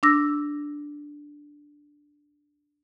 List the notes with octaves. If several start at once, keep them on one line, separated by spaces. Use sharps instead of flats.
D4 D6 E6 A#6